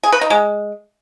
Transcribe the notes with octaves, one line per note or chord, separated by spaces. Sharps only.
G#4
B4
D#4
G#3